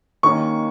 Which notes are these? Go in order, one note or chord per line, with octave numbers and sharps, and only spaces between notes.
D#2 D#3 A#3 C#4 C#6